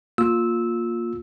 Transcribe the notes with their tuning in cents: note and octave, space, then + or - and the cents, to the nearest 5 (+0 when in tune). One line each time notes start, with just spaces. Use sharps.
A#3 +0 F4 +15 E6 -15